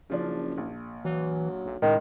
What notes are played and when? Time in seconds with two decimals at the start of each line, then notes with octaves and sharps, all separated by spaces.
0.10 F#1 C#3 F3 D4
0.58 A#1
1.05 E3 F#3
1.65 B1
1.82 C#2 A2 D#3